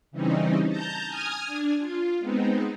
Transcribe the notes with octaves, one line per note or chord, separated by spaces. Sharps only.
C#3 E3 G3 C4 C#4 D#4
A5 A#5 G6
G#5 D#6 F6 G#6
D4
F4
G#3 B3 C4 D#4